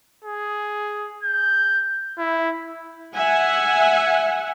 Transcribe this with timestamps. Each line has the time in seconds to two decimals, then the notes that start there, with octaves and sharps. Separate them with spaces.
0.24 G#4
1.23 G6
2.18 E4
3.13 E5 F#5 G#5